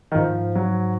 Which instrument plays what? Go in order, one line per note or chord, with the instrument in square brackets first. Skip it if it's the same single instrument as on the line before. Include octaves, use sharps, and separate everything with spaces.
[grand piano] D#3
[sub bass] G#2 [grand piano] F3
[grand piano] F#3